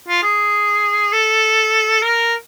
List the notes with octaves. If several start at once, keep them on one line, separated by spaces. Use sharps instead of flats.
F4
G#4
A4
A#4